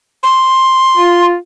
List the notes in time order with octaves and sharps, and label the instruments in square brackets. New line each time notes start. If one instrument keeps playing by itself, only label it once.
[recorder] C6
[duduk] F4